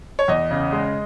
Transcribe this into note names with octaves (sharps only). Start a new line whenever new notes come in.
C#5
E2 D#5
C#3
G#3